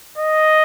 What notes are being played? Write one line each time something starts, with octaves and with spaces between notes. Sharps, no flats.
D#5